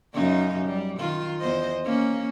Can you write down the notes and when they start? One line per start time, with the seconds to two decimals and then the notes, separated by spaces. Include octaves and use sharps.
0.14 F#2 C#3 D#4
0.66 G3
0.98 D#3 F4
1.39 E2 C5 D#5
1.85 A#3 C#4